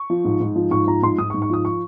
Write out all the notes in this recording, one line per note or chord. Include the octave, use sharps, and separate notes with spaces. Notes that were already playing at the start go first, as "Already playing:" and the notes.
Already playing: C#6
F3
G#2
G#2
F3
G#2 C#6
F3 A#5
G#2 C6
G#2 D#6
C#6
G#2
C#6
F3 D#6
C#6